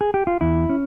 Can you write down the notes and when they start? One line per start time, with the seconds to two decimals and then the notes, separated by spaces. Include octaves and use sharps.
0.01 G#4
0.14 G4
0.27 F4
0.41 E2 E4
0.69 C#4